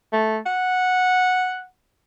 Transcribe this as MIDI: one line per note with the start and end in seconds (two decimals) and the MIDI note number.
0.13 0.38 57
0.46 1.66 78